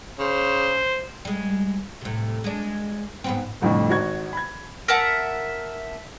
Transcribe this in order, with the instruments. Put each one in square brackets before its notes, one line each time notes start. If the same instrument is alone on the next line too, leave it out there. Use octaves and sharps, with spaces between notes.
[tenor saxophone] C#3 [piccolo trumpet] C5
[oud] G3 G#3
A2 C3
G#3 D4
G#2 B3 C4
[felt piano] C2 F2 A2 D3
G#1 F#4 C#6 G#6
B5 G#6
[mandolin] A#4 E5 F#5 A5